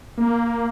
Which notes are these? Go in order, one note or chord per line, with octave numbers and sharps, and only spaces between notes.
A#3